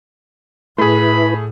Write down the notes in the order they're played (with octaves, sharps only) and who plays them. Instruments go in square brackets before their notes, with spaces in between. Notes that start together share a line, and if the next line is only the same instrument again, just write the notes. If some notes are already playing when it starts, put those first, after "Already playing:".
[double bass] A2 [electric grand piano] A3 G#4 [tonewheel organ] E4 B4 [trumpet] B5